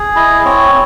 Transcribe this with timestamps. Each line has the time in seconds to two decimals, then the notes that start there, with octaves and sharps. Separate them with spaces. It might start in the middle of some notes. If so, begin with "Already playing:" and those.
Already playing: G#4
0.16 E4 D#5
0.45 C4 C#5